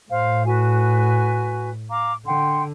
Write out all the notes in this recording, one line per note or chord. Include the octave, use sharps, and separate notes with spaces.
A2 C5 F5
F#4 B4 G#5
F5 A#5 D6
D3 F#5 G5 C6